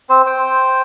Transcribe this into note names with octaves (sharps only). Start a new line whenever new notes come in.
C4 C5
C5 G5